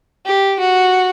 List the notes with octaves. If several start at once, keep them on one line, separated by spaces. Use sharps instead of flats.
G4
F#4